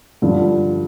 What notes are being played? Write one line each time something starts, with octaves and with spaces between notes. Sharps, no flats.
G2 D3 F3